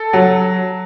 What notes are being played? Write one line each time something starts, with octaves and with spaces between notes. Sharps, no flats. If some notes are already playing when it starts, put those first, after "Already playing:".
Already playing: A4
F#3